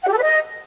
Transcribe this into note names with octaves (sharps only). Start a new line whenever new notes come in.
F#5
G4
A4
B4
D#5